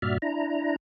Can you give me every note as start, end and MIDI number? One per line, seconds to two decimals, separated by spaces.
0.02 0.18 43
0.02 0.18 46
0.02 0.18 66
0.02 0.18 74
0.02 0.18 76
0.02 0.18 89
0.22 0.76 62
0.22 0.76 64
0.22 0.76 82